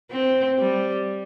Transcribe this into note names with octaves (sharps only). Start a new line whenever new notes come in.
C4
G3